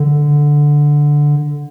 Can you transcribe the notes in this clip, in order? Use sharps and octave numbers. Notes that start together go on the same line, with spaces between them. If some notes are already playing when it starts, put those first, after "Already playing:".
Already playing: D3